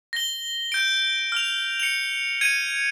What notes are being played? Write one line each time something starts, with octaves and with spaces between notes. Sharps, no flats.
A#6 G7
G6 D7
F6 F7
C#7 F7
G#6 C#7 D#7